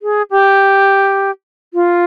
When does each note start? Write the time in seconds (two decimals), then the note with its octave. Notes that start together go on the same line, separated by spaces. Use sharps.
0.02 G#4
0.31 G4
1.74 F4